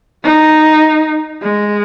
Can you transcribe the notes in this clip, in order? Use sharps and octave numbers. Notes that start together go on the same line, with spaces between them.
D#4
G#3